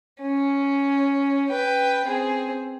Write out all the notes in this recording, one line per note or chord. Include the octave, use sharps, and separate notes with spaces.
C#4
B4 G5
C4 G#4